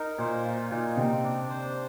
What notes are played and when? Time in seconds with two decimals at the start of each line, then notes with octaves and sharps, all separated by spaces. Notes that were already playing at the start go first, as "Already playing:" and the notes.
Already playing: D#4 A#4
0.18 A#2 C5
0.44 F4
0.70 A#2 D#4
0.97 C3 C4
1.23 D4
1.49 C5